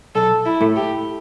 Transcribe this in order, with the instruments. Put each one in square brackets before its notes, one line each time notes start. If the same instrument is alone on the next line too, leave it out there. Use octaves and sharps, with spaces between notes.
[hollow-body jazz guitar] B1 [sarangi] A4
[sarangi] E4
[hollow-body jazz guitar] A2 A3
[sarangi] G4